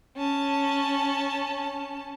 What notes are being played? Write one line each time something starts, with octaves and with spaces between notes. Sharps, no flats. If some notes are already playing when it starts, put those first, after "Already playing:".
C#4 A5